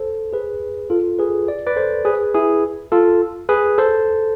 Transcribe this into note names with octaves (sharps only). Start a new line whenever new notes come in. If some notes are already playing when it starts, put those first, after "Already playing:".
Already playing: A4 C5
G#4 B4
F4 A4
G#4 B4
D5
B4 D5
A4 C5
G#4 B4
E4 G#4
F4 A4
G#4 B4
A4 C5